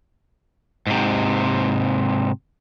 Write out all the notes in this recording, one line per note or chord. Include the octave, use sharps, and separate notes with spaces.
G#2 C3